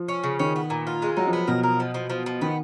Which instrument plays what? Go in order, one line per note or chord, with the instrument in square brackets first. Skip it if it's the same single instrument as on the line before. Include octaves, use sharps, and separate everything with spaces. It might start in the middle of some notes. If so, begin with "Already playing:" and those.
Already playing: [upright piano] F3
[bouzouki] C#4
C#3
[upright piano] D#3 [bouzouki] C#4
[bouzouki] B3
A#2
F4
G#3
[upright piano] F#3 [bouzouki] D#4
[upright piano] F3
[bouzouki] B3
[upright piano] B2 [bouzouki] A#4
[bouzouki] A#4
F3
F3
F3
F3
[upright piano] D#3 [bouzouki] B3